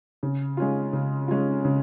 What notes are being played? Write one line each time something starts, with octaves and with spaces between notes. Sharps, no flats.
C#3
G#3 C#4 F4
C#3
G#3 C#4 F4
C#3